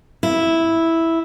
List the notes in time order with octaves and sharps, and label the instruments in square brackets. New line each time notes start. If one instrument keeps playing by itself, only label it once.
[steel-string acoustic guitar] E4